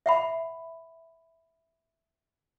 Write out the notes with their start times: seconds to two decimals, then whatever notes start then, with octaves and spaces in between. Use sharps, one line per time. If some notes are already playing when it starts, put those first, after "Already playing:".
0.06 E5 F#5 B5